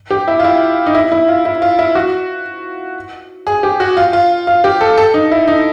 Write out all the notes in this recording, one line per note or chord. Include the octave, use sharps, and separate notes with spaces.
G4
E4
F4
E4
D#4
E4
E4
F4
E4
F4
E4
F#4
G#4
G4
F#4
F4
F4
F4
G4
A4
A4
D#4
E4
D#4